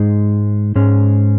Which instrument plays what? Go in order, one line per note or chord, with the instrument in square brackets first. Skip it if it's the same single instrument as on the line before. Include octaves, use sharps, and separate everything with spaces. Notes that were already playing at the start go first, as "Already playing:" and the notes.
Already playing: [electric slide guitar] G#2 G#3 D#4
G#2 G#3 C#4